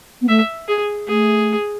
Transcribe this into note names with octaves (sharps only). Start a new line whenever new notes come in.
B3
A3 E5
G#4
A3 G#4